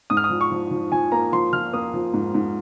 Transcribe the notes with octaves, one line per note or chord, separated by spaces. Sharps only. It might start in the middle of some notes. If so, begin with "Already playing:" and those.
G#2 D#6
F6
D#6
F3
C#6
F3
F3
F3 G#5
A#3 A#5
F3 C6
F3 F6
A#3 D#6
F3
G#2
G#2